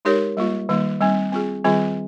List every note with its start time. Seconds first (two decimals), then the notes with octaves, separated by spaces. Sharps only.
0.05 G#3 D#4 G4 A#4 C#5
0.37 G3 A#3 F4
0.69 D#3 G3 A#3 D#4
1.01 G3 C4 D#4
1.32 C4 F4 G#4
1.65 D#3 G3 C4 F4 G#4